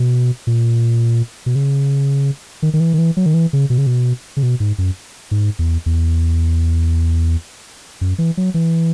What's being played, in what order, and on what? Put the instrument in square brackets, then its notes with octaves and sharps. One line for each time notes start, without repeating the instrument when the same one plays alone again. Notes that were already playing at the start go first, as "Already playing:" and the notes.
Already playing: [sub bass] B2
A#2
B2
C#3
D#3
D#3
E3
D#3
E3
F#3
D#3
E3
C#3
B2
C#3
B2
C#3
B2
G#2
F#2
G#2
E2
E2
F#2
E3
F#3
E3